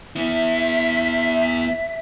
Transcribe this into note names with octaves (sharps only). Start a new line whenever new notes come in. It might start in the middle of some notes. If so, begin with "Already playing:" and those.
B3 E4 E5